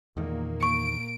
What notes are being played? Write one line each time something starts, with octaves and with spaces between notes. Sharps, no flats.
E2 A#2 D#3 A#3
C#6 D7